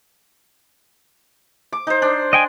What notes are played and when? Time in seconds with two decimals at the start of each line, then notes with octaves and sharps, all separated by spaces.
1.73 D6
1.87 D#4 C5
2.02 D4
2.33 D#5 G5 G#5